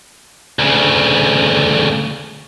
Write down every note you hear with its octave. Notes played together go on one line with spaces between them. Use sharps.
D2 C#3